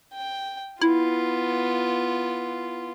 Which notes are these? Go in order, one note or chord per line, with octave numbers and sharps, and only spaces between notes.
G5
B3 E4 F4